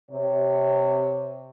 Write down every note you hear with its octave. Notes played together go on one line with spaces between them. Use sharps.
C3 C#5